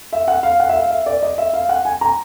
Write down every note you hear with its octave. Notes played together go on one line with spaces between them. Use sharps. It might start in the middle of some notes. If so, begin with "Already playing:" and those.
E5
F#5
F5
F#5
E5
F5
E5
D5
D#5
E5
F5
F#5
G#5
A#5